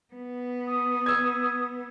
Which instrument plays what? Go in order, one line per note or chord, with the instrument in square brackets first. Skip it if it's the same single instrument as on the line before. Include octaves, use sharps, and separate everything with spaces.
[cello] B3
[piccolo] D#6
[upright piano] E6 G#6